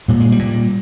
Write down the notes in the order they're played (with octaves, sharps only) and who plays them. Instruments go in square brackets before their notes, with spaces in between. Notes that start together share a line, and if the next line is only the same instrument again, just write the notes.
[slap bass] A#2 G3
G#3
G3
A#2